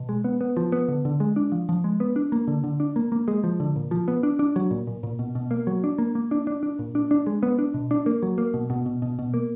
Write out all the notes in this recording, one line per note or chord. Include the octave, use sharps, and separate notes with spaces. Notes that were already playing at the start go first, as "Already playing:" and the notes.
Already playing: B2
G#3
B3
B3
F3
B3
D3
D3
G#3
D4
F3
F3
G#3
B3
D4
A#3
D3
D3
D4
A#3
A#3
G#3
F3
D3
A#2
F3
B3
D4
D4
F#3
A#2
A#2
A#2
B2
B2
A#3
F#3
D4
A#3
A#3
D4
D4
D4
A#2
D4
D4
G#3
B3
D4
B2
D4
A#3
F#3
A#3
B2
B2
B2
B2
B2
A#3